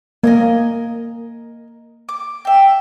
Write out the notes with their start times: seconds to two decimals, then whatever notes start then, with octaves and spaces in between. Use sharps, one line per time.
0.24 A#3 A#4 D#5 G#5
2.09 D6
2.45 E5 G5